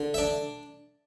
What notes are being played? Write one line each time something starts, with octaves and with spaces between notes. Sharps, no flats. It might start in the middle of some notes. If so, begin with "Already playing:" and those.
Already playing: D3
E5
D4 D5